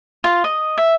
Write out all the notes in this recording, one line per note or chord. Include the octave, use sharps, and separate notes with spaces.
F4
D#5
E5